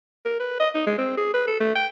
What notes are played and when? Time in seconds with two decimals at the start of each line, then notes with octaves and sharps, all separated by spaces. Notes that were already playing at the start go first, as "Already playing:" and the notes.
0.25 A#4
0.40 B4
0.60 D#5
0.75 D#4
0.87 G#3
0.98 C4
1.17 G#4
1.34 B4
1.47 A4
1.60 A3
1.76 G5